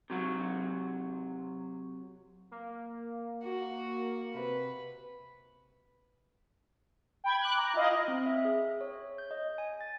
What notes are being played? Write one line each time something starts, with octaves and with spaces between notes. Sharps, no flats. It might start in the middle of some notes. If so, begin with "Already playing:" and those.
C3 F#3 F#4
A#3
F#4
C3 B4
G5 B5 G#6
D6 F#6
A#5
E4 F4 D#5 F5
C4
E5
G#4
C#5
G6
D#5
G#5
A6